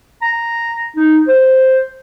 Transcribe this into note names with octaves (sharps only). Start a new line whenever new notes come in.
A#5
D#4
C5